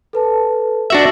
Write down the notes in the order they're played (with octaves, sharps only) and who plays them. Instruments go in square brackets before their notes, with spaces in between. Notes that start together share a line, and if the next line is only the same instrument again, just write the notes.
[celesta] A4 B4 A5
[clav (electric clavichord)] D4 F#4 E5 [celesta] A#6 F#7